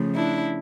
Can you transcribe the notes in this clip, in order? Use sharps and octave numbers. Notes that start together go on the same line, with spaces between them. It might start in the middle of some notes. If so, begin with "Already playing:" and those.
Already playing: C#3 F3 A3
D4 E4